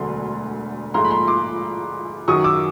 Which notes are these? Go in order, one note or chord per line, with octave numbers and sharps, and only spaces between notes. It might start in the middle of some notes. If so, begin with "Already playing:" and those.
Already playing: E1 D2 D3 F#3 A3 C6
A#1 G#2 F3 A3 A#5 C6
B5
A#5 C6
C6 D6
F#2 D#3 F#3 C#6 D#6
D6 E6